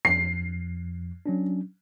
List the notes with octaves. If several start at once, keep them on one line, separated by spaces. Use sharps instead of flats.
F2 F3 C7
F#3 C#4 D4